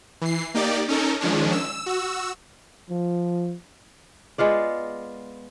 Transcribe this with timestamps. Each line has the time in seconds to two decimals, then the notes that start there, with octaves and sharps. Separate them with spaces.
0.21 E3 C7
0.54 A#3 D#4 G4 D5
0.88 C#4 D#4 A4 A#4
1.21 D#3 F3 G#3 C#4 D4
1.52 E6
1.86 F#4 E6
2.90 F3
4.38 G#3 B3 F4 D5